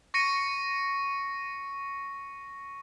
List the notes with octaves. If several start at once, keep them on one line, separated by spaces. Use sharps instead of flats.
C#6 A#6 C#7 D#7